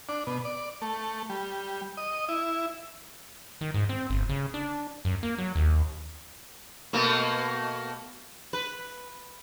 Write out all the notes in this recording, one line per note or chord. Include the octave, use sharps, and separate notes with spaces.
D4
B2
D5
A3
G3
D#5
E4
D#3
G#2
C4
G1
C#3
D4
F#2
A#3
F#3
D#2
B2 A3 A#3
B4